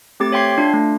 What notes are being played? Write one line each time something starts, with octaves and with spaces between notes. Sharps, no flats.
A3 C4 G4 D6 A6
C#5 E5 G5 C6 G#6 C7
D4 F4
A3